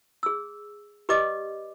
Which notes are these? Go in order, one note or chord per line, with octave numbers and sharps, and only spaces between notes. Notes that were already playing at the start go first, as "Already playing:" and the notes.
G#4 E6
G4 B4 D5 D#5 D6